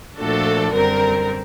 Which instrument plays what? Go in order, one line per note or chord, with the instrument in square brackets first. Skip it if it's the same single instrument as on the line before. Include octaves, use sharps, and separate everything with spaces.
[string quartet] A#2 F3 A3 D4 F#4 [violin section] A4
[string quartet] F#2 D3 G3 C4 [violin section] A#4